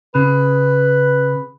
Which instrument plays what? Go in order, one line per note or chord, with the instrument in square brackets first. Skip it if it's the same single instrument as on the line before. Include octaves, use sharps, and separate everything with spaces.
[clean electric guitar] C#3 [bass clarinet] B4